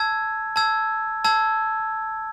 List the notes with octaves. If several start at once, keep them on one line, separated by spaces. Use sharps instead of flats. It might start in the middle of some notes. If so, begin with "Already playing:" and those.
Already playing: A5 E6 G#6
A5 E6 G#6
A5 E6 G#6